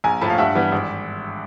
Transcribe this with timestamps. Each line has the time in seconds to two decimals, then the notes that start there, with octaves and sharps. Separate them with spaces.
0.04 A#1 G#5 A#5
0.21 A2 F3 A3 A5 B5
0.30 F5
0.38 G2 E5 F#5
0.55 E3 G3 B3
0.72 G#1